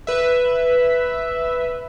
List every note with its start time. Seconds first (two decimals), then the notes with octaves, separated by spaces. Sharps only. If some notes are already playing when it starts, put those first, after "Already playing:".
0.07 B4 E5